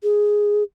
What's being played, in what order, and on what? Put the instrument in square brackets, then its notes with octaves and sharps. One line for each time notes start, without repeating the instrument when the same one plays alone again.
[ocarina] G#4